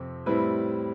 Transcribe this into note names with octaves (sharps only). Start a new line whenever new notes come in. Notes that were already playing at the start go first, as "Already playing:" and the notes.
Already playing: F2 C3 C4
A2 G3 C4 E4 B4